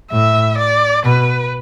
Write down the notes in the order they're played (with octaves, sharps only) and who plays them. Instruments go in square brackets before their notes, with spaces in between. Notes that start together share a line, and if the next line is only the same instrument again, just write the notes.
[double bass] A2 [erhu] E5
[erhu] D5
[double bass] B2 [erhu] B4